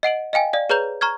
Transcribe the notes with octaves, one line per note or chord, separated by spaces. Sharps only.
D#5 F#5 D7 F#7
D#5 F5 G5 G#5
D5 F5
G#4 B4 C#5 A#5 G6 F7
A#5 C#6 F6 G#6